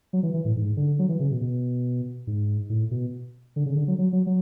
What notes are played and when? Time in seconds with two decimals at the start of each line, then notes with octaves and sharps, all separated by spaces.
0.13 F#3
0.23 E3
0.34 E3
0.45 A2
0.56 G#2
0.77 D3
0.99 F#3
1.09 E3
1.20 C#3
1.31 B2
1.41 B2
2.27 G#2
2.69 A2
2.91 B2
3.56 D3
3.66 C#3
3.76 D3
3.88 F#3
3.99 F#3
4.13 F#3
4.26 F#3